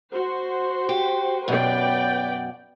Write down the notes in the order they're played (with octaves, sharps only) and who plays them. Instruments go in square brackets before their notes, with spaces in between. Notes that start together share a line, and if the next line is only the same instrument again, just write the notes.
[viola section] F#4 C5
[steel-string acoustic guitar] G4
[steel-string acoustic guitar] F#2 B2 [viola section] B4 D5 G5